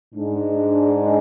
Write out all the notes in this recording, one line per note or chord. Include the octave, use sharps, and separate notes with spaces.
G#2 G#3 D4